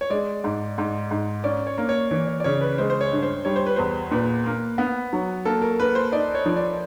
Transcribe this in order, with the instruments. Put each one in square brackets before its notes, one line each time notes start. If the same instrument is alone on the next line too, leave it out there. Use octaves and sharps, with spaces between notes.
[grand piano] C#5
[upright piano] G#3 [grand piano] D5
[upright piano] G#2
G#2
G#2
[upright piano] C#4 [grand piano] D5
[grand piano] C#5
[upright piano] A#3
[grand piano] C#5
[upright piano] E3 [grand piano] C#5
[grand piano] C#5
D5
[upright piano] C#3 [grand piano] C#5
[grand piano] B4
[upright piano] G#3 [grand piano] C5
[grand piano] C5
C#5
[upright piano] G2
[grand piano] C5
[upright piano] G3 [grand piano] C#5
[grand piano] C5
B4
[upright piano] E2 [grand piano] C5
[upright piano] A#2 [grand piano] B4
[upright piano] A#3
B3
F#3
[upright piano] A#3 [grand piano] A4
[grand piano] A#4
[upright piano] A#3 [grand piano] B4
[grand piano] C5
[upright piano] D#4 [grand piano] D5
[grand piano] C#5
[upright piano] F3
[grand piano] D5